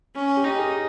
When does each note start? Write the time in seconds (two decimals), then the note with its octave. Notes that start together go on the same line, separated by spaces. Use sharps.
0.16 C#4
0.37 G4
0.44 D#4
0.59 G#4